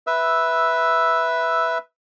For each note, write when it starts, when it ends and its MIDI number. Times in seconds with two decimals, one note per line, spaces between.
0.07 1.78 71
0.07 1.78 76
0.07 1.78 88